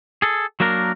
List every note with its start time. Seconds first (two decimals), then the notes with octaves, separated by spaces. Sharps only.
0.22 G#4 A4
0.60 F#3 A#3 D4 A#4